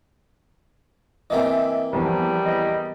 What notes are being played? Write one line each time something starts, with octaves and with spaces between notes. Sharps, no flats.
E3 A#3 C4 D#5 E5 G#5
E2 F3 G3
D#5